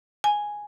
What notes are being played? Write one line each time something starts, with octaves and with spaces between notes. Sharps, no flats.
G#5